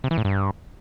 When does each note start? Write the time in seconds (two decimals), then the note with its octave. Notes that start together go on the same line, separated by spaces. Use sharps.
0.04 C3
0.11 E3
0.18 A2
0.25 G2